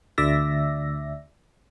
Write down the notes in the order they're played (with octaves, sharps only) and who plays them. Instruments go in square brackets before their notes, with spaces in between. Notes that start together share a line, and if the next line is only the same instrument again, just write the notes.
[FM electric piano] D2 D5 E5 A#6